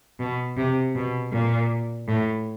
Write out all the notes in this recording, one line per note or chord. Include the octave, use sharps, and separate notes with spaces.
B2
C3
B2
A#2
A2